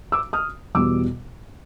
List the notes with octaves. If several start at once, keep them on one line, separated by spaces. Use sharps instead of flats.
D6 E6
D#6 F6
E2 B2 G3 D6 E6